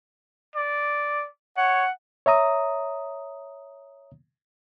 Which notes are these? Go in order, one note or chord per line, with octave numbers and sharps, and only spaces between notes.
D5
C#5 F#5
C#5 E5 A#5 D#6